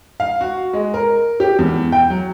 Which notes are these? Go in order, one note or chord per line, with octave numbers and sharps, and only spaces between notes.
F5
F#4
G#3
A#4
G4
E2
G5
F#3